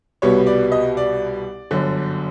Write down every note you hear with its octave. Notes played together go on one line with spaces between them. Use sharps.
C2 B2 G3 B3 C#5
D5
D#5
D5
G1 F#2 D3